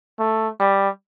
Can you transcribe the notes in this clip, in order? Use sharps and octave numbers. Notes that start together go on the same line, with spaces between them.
A3
G3